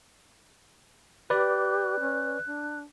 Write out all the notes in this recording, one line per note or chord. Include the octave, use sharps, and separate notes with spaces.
G4 B4 D5 F#6
C#4
D4